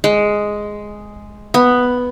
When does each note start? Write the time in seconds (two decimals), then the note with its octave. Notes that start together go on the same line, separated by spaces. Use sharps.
0.04 G#3
1.54 B3